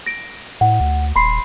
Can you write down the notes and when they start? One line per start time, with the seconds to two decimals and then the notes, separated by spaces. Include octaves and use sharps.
0.06 A#6 D7
0.61 A2 F#5
0.81 D2
1.16 D#1 B5 C6 C7